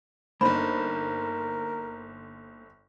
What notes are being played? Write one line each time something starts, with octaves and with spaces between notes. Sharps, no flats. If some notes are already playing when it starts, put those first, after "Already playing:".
G1 A#3 D4 D#4 A#4 C5 B5